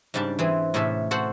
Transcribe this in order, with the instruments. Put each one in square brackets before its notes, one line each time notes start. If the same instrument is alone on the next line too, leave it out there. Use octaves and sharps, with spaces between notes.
[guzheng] G#2 C#3 G3 D4 A5
E3 C4 G#4
A2 C3 C#4 G#4 A4 E5
F#4 A4 C5 F#5